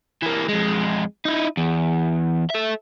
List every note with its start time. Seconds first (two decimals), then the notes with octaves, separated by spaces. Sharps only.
0.22 E3 A#3
0.49 F2 G#3
1.25 D#4 E4
1.57 E2
2.50 A4 E5